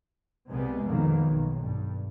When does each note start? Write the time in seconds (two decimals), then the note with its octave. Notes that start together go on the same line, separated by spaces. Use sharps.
0.49 C2 C3 G3 G#3 B3
0.86 F2 B2 D#3 A#3
1.24 B1
1.62 G2